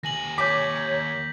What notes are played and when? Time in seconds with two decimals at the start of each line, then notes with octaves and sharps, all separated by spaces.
0.03 D#2 G#5 A#6 F#7
0.38 C#5 D6 G6 B6